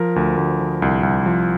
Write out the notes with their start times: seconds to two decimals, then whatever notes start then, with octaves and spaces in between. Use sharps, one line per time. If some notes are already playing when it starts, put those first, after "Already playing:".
Already playing: F3 A#4
0.16 D2
0.37 D2
0.60 F3
0.82 C2
1.03 C2
1.26 F3